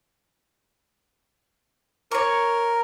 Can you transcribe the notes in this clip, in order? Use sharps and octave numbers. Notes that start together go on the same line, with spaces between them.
A#4 C#5 C#6